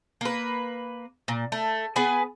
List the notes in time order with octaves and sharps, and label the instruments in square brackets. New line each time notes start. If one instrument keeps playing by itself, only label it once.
[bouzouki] A#3 B4
A#2
A3
B3 G#4 B4 G#5